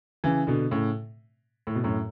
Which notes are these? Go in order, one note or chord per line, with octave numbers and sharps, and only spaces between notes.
C#3 E3
B2 D3
A2 C#3
A2
B2
F#2 A2